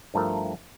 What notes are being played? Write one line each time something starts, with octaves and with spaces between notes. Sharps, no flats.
G2 F3 A3 E4 A#4